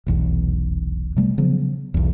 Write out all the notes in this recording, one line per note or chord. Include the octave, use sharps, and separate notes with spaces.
F1 B1 E2
C3 G3 A3
C#3 F3 F#3 B3
B1 E2